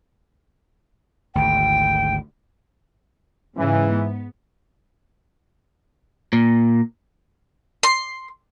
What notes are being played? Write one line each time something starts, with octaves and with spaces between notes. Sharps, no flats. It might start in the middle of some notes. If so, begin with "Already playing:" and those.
G#1 D2 G5
G#2 C#3 E3
B3
A#2
C6